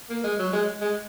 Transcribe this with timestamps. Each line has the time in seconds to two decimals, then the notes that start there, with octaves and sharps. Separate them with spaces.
0.09 A#3
0.24 G#3
0.39 F#3
0.53 G#3
0.81 G#3